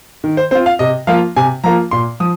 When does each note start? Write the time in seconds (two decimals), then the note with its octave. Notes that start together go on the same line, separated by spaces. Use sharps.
0.24 D#3
0.37 C5
0.51 C4 F4 C5
0.66 F5
0.79 C3 D#5
1.07 F3 A#3 F4 F5
1.36 C3 G#5
1.64 F3 A#3 F4 A#5
1.91 A#2 C6
2.20 F3 D#6